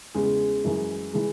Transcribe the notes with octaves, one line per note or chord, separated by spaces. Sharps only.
E2 C#3 G#3 G#4
F#2 E3 G#3
E3 G#3